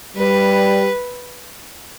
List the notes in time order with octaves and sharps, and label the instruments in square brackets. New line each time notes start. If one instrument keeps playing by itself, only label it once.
[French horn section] G3 [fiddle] B4